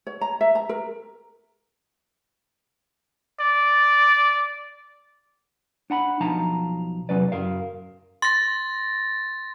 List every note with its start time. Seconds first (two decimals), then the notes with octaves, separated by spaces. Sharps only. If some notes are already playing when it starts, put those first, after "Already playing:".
0.07 C#5
0.21 A#5
0.41 E5
0.55 A#5
0.69 A#4
3.40 D5
5.90 D4 F#5 A#5 B5
6.20 B1 F3 D#4 F5 A5 A#5
7.09 E2 C3 F#3 C#4 B4 D5
7.32 F#2 A#4 F5
8.22 C6 A6 A#6